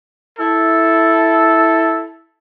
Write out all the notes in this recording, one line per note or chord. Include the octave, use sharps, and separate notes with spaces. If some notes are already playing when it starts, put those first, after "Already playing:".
E4 A4